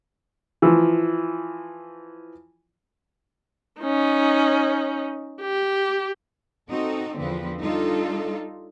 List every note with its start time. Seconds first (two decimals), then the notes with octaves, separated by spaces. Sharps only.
0.62 E3 F3
3.81 C#4 D#4
5.41 G4
6.68 C4 D#4 F#4 A4
7.19 E2 D3 F3 C4 B4
7.61 G3 D4 D#4 F4 A4